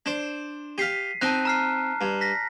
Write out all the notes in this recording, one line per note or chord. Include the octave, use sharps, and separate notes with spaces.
D4 C5
G4 F5 B6 C7 D#7
C4 D#4 A5 F#6
A#5 F6 C7
G2
A#6 B6